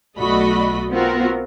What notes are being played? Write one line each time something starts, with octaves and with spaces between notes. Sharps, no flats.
B1 A3 F#4 D5 D#5 B5
B3 C4 F4 F#4 A#4